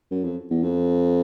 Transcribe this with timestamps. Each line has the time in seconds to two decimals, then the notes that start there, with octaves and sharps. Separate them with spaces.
0.11 F#2
0.24 F2
0.51 E2
0.63 F2